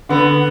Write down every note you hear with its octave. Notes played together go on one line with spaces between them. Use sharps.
D3 B3